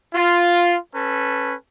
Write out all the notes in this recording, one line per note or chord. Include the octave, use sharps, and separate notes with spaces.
F4
C#4 A4 B4